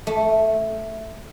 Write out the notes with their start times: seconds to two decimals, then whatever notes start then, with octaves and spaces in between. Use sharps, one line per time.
0.07 A3